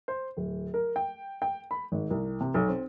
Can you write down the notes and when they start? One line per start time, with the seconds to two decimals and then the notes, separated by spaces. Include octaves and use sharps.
0.08 C5
0.37 D1
0.74 A#4
0.96 G5
1.42 G5
1.71 B5
1.92 G#1
2.11 C2
2.40 C3
2.54 B1
2.68 C4